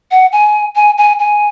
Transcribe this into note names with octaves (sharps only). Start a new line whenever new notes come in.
F#5
G#5
G#5
G#5
G#5